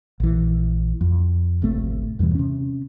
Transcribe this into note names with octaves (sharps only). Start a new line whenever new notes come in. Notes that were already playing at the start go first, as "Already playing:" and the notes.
A#1 E3
F2
D1 G#1 C3 A3
E2 G2 B2 E3
C3 C#4